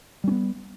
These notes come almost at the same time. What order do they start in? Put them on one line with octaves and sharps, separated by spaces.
G3 C#4 B3